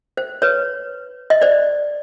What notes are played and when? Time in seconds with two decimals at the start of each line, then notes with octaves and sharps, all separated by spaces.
0.17 C5
0.42 B4 C#5
1.30 D#5
1.41 C5 D5